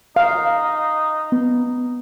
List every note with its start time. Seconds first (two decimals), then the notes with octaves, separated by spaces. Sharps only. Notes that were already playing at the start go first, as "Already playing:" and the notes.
0.16 D#4 F5
1.32 B3